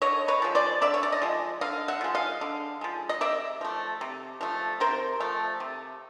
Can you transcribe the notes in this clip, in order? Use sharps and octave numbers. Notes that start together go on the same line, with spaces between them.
D3 C#5 D#5
B4 C#5
F3 G#3
C5 D5
D3 D5 E5
C#5
D5
D#5
F3 G#3
D3 D#5 F5
E5 F#5
F3 G#3
D#5 F5
D3
F3 G#3
D#5
C3 D5 E5
F3 A3
C3
F3 A3
C3 A#4 C5
F3 A3
C3